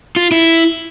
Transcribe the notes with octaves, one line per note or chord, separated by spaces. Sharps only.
F4
E4